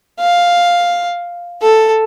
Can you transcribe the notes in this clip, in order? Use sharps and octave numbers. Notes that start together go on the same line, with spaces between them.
F5
A4